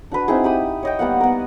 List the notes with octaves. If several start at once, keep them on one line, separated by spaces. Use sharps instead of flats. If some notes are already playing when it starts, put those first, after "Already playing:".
D4 F#4 B4
C4 D#4 E4 G#4
G4 B5 D#6
C#5 D#5 G5
G3 A#3 B3 F#5
B3 A#4